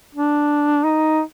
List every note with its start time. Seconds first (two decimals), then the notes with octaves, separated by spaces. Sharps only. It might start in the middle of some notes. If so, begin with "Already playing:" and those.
0.15 D4
0.84 D#4